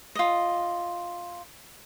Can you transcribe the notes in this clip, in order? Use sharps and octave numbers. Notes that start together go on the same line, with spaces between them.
F4 D#5